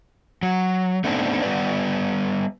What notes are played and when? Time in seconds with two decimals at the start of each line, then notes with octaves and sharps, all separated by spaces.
0.42 F#3
1.04 A3 B3 C4 D4 D#4
1.42 G3 B3 B4 D5